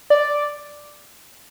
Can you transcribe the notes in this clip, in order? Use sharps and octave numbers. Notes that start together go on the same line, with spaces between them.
D5